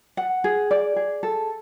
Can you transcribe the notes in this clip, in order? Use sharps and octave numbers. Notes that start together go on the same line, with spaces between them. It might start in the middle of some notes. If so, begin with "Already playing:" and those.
F#5
G#4
D5
G#4
A4